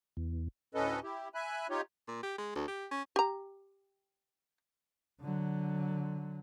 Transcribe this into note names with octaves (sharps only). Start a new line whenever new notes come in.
E2
D2 A2 C#4 A4 B4 D#5
E4 G4
E5 G#5 B5 F#6
D#4 F4 G4 C#5
A#2
G4
G#3
D2
G4
C#4
G4 A#5
D3 F#3